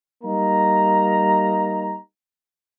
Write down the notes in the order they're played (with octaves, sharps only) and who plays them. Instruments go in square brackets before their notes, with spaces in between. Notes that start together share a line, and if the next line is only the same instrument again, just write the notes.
[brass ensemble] G3 A#3 D#4 A#5